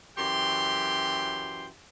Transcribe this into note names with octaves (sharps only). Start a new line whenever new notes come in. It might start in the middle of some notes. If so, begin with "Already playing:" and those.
F#2 E3 F#3 G4 G5 C6